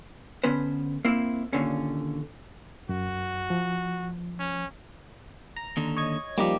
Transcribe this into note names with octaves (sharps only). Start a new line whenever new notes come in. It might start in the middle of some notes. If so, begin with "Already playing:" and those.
D3 B3 C#4 B4 C5
A#3 C4 E4
D#2 A#2 D3 C#4
F#2 F#4
F3
C#4
A#5
D#2 D3
C#5 D#5 G#6
F3 G3 A#3 D#4 G4